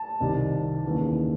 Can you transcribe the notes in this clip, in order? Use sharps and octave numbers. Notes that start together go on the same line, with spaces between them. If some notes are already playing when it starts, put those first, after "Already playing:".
Already playing: A5
C2 C3 D#3
D#2 C#3 E3